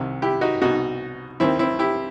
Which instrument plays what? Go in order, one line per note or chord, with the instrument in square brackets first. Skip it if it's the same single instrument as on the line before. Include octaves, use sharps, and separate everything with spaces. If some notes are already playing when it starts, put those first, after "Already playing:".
Already playing: [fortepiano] C2 C3 D#3
E4 G4
D#4 F#4
C2 B2 D#4 F#4
D#2 D#3 C4 E4
C4 E4
E4 G4